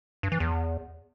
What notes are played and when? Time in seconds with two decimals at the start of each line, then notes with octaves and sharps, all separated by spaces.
0.23 G2
0.32 E3
0.40 E2